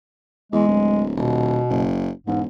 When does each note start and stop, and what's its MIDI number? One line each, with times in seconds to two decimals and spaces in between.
0.52 0.64 40
0.52 1.03 56
0.68 1.12 26
1.16 1.62 27
1.16 1.85 47
1.70 2.10 30
2.27 2.47 28
2.27 2.40 44